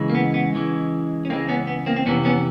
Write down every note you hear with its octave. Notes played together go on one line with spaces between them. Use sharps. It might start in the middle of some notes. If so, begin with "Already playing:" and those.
Already playing: C#2 C#3 E3 G#3
A#3
B3
B3
C#2 C#3 E3 G#3
C#4
C#2 C#3 E3 G#3 A#3 C4
B3 C#4
B3
A#3 C4
C4
F2 C3 E3 B3 C#4
B3 C#4